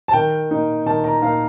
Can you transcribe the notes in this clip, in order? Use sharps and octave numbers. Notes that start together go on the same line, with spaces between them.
A5
D#3 G5
A#3 D#4
D#3 A5
A#5
A#3 D#4 F5